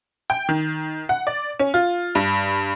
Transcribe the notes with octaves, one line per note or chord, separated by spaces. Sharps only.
G5
D#3
F#5
D5
C#4
F4
G2